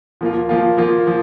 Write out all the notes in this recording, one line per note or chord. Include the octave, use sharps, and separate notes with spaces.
F3 A#3 F4
F3 A#3 F4
F3 A#3 F4
F3